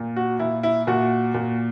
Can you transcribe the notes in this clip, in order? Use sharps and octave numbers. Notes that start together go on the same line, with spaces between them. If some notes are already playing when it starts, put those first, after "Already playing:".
Already playing: A#2
F#4
A#2 E4
E4
A#2 F#4
A#2